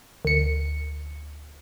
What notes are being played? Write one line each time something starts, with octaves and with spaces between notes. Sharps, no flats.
D2 C#7